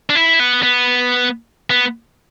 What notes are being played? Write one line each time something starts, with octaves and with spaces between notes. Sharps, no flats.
D4
E4
B3
B3
B3